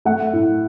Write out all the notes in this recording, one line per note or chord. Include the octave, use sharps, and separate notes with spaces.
A3 F#5
A2